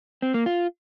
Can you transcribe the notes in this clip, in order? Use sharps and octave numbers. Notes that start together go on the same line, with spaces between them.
C4
A#3
F4